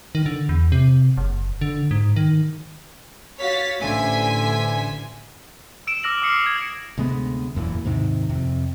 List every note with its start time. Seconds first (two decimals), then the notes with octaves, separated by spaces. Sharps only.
0.15 D#3
0.26 D3
0.49 E2
0.72 C3
1.17 F#1
1.61 D3
1.91 G#2
2.16 D#3
3.39 F#4 C#5 F5 A6 B6
3.79 A1 D3 C5 E5 G#5 B6
5.87 E6 D7 E7
6.03 D6 E6 F6 A#6 D7 F#7
6.22 D6 D#6 F6 C7 C#7
6.46 G#6
6.98 D2 C3 G#3 B3
7.55 E1 F#2 A#2 E3
7.85 D#2 G#2 C3 D#3
8.29 F2 C3